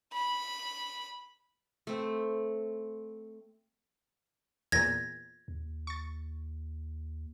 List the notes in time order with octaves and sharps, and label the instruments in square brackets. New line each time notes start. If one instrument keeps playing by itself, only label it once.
[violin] B5
[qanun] A3 C4
[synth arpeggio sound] E2 A#2 [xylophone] G#6 A#6
[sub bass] D#2
[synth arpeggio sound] C#6 A6